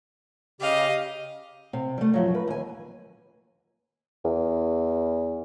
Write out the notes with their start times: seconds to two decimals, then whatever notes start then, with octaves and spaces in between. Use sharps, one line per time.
0.61 C#3 G4 D#5 F5
1.73 C3
1.98 G3 A3
2.14 F#2 F3 F#3
2.35 B4
2.48 D#2 G#5
4.25 E2